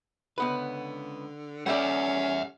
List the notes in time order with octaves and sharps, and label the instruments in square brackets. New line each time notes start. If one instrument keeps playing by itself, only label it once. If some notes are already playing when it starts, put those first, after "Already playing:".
[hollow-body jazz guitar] C#2 B3 B4 [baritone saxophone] D3
[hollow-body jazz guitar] G3 A3 D5 [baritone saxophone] C#4 [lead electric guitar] E5 F#5